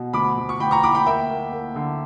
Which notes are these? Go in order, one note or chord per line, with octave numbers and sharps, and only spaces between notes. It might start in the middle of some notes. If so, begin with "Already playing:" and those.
Already playing: B2
D2 B5 D6
D2
C#6
D2 G5 B5
A#5 C#6
D2 B5 D6
G5 B5
A#3 E5 G5
A#3
A#3
D3